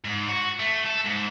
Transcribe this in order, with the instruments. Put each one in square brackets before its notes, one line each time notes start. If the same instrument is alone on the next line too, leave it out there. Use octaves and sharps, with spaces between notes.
[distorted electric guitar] G#2
F#4
A3
A4
G#2